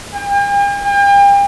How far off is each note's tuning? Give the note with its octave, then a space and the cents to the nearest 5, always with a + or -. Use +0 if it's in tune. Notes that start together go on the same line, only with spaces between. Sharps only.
G5 +45
G5 +40